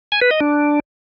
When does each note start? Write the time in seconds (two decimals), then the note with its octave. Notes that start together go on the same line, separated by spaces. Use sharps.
0.12 G#5
0.21 B4
0.31 D#5
0.40 D4